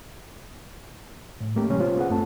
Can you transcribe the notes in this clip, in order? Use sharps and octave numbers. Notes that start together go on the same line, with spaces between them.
A2
A3 A#3 C#4 G4
C3 E3 G3 G#3 C#4
B3 F4 C5 C#5
B3 G#4 F#5
F#2 A3 C4 F4 A4 A5